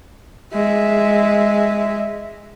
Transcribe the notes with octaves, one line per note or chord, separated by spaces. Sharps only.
G#3 E5